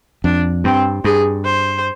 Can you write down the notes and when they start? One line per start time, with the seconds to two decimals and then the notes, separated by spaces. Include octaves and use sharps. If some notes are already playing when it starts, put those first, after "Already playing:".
0.24 F2 D4
0.64 G2 C4
1.04 G2 G#4
1.45 C5